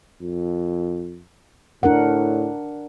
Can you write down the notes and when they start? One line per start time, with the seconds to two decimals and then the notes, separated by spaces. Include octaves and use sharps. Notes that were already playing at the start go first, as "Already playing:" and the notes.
0.22 F2
1.83 A2 D4 A#4 F#5